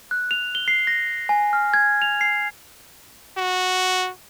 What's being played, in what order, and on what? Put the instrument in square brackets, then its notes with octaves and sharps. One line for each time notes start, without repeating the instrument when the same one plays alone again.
[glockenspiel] F#6
F7
G7
C7
A#6
G#5
F6
G#6
F7
C7
[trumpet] F#4